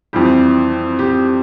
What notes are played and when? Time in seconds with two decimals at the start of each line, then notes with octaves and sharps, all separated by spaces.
0.13 F2 E3 G3 G4
0.99 G4